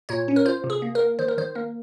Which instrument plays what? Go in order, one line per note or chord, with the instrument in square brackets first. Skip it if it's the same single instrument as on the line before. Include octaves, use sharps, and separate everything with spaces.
[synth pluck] A#2 C#5
C#4
A#4
F4 C5
C3
G#4
A#3
A#4
A#3
D#3 C5
A#4
D#3 C5
A#3 A#4